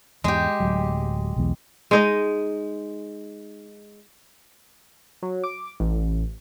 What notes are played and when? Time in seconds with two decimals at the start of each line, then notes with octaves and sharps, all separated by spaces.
0.24 E2 G#2 G#3 G4
0.60 D1 F#3
1.36 B1 E2
1.91 G#3 D#4 D#5
5.22 F#3
5.44 D6
5.80 A1